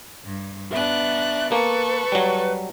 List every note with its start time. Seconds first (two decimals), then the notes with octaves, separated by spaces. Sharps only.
0.24 G2
0.72 B3 D4 A#4 E5 F#6
1.52 A#3 A4 B4 C#6
2.12 F#3 G3